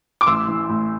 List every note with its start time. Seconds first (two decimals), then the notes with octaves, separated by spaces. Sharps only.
0.21 D6
0.26 A1 C6 E6
0.48 E3
0.69 A2